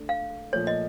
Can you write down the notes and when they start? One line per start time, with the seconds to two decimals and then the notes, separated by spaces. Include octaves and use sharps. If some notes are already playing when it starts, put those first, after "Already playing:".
Already playing: A3 D4
0.09 F5
0.53 A#2 F3 A3 C#5
0.67 D#5